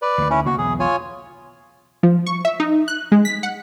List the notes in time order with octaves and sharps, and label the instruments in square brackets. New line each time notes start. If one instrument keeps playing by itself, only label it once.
[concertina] B4 D5
[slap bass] D2 D#3
[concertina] C#4 E4
[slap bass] C#3 A#3 B3 [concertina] F#4
[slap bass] B1 E2 [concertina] G#4
[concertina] F4 C#5 G#5
[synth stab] F3
C#6
E5
D#4
F#6
G#3
B6
F#5